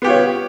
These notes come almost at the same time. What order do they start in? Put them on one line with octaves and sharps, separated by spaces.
B3 G4 F4 C#5